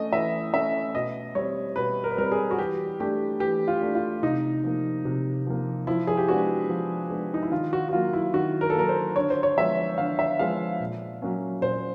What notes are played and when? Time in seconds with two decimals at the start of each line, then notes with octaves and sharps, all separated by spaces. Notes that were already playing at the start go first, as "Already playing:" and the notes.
Already playing: A3 C#4 D#5
0.12 E3 E5
0.53 A3 C#4 E5
0.94 B2 D#5
1.35 G3 C4 C#5
1.76 B2 B4
2.04 A#4
2.11 B4
2.17 G3 C4 A#4
2.32 G#4
2.51 F#4
2.58 E3 G4
3.00 A3 D4 G4
3.40 E3 G4
3.68 F4
3.82 A3 D4
3.95 F4
4.23 C3 D#4
4.64 F3 A#3
5.05 C3
5.47 F3 A#3
5.87 F3 E4
6.07 G#4
6.17 G4
6.28 G#3 B3 D4 F#4
6.69 F3
7.10 G#3 B3 D4
7.34 D#4
7.42 E4
7.51 D#3 F4
7.73 F#4
7.89 F#4
7.93 F#3 A#3 F4
8.13 E4
8.34 D#3 F#4
8.61 A#4
8.70 A4
8.76 F#3 A#3 A#4
8.89 C5
9.16 D3 C#5
9.30 C5
9.43 C#5
9.56 F3 G#3 B3 E5
9.98 D3 F5
10.19 E5
10.39 F3 G#3 B3 F5
10.80 A#2
11.22 F#3 A#3 C#4
11.62 A#2 C5